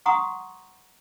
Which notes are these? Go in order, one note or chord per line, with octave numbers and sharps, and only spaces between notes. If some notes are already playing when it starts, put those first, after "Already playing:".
F#5 A#5 C6 C#6 D#6